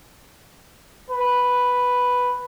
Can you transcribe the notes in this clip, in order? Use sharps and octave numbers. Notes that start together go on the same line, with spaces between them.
B4